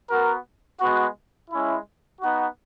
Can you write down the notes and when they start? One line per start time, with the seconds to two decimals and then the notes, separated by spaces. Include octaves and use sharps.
0.10 B3 F#4 A#4
0.81 G#3 B3 F#4
1.50 G#3 C#4 E4
2.21 B3 D#4 F#4